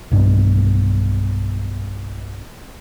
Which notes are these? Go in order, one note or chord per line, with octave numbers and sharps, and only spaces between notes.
B1 G2 B2